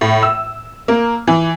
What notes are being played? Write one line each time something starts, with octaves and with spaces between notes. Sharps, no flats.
A2
E6
A#3
E3